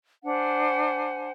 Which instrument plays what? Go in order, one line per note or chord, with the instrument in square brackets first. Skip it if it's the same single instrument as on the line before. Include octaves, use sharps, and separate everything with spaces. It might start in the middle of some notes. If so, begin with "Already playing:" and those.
[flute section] D4 C5 F#5 G#5